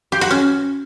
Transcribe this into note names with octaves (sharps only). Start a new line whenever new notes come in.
G4
F#4
C#4